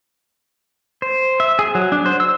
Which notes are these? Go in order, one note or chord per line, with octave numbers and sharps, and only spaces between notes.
C5
E5
G#4
F#3
D4
C5
E6